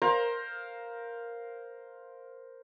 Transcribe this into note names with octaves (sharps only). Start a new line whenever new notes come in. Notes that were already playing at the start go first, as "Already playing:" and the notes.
A#4 C5 F5 A#5